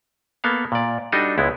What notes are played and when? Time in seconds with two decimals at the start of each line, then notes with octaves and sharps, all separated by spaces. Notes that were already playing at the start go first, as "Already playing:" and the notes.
0.44 A#3 B3 A4 F5
0.72 A#2 D5
1.12 G3 D4 D#4 F#4 A4 D#5
1.38 C#2 G#3 B3 E4